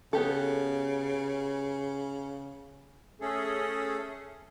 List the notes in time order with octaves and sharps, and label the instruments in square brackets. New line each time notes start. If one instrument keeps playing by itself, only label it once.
[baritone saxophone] C#3 [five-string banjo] B3 G4 A4
[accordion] A3 C#4 G#4 A4